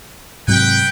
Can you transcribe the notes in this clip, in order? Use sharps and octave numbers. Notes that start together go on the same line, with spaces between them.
G#2 C3 F#3 B4 F#5 G5